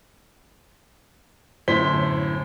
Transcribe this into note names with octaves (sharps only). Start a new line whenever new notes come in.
G1 F#2 A2 C5 B6 G7